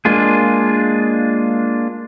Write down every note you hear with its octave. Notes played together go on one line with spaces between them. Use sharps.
G#3 A#3 D4 F4 G#4